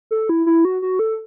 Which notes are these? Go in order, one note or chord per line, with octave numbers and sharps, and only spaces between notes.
A4
E4
E4
F#4
F#4
A4